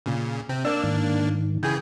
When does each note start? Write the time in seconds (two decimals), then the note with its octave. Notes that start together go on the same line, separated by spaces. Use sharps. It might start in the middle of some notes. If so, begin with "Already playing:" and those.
0.06 A#2 C#3
0.49 C3 C4
0.65 A#3 D4 D5 E6
0.83 G#2 D#3
1.63 C#3 E3 G#4 G5 G#5